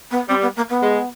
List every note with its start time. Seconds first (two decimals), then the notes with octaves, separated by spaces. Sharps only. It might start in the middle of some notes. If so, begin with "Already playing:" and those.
0.11 B3
0.28 G3 C4
0.41 B3
0.56 A#3
0.69 B3
0.83 G#3